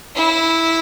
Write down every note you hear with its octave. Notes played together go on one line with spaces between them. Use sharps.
E4